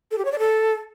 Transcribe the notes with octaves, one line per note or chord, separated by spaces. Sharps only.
A4
G4
C#5
D5
A4